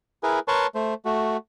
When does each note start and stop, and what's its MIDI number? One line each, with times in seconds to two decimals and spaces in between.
0.23 0.39 64
0.23 0.39 68
0.23 0.39 70
0.23 0.39 71
0.48 0.67 70
0.48 0.67 71
0.48 0.67 73
0.48 0.67 81
0.48 0.67 84
0.48 0.67 85
0.75 0.94 57
0.75 0.94 72
1.05 1.37 57
1.05 1.37 66